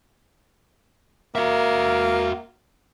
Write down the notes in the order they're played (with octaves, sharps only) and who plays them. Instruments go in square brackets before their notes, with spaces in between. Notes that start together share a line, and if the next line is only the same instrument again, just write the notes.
[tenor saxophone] A#3 [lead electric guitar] F#4 E5